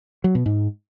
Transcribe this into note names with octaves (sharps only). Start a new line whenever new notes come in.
F#3
B2
G#2